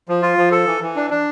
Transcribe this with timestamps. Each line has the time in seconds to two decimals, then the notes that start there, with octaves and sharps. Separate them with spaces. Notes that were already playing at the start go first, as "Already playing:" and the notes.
0.09 F3
0.22 F4
0.38 F3
0.52 A4
0.67 E3
0.82 E3
0.96 D4
1.10 D4